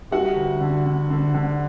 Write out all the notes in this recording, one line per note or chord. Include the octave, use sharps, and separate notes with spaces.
G3 F#4 F#5
D2
D3
D3
D3
D3